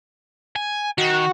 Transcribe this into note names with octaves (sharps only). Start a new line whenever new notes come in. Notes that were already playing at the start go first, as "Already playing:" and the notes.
G#5
D#3 F#4